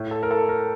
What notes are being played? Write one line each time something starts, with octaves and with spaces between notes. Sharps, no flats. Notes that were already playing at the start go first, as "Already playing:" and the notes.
Already playing: A2
A4
A#4
A4
A#4